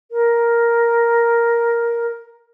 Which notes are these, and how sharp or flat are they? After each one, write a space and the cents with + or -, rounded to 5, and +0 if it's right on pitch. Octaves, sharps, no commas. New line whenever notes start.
A#4 +5